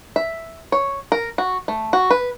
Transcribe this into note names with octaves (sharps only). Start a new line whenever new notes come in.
E5
C#5
A#4
F#4
A3
F#4
B4